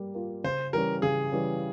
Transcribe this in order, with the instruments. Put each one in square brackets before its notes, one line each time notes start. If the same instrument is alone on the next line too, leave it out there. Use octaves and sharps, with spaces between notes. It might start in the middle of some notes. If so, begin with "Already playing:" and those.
Already playing: [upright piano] G3 A#3
A#3 F4
[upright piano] C#3 [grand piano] C5
[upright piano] E3 G3 C#4 [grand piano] A#4
[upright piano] C#3 [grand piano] G#4
[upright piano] E3 G3 C#4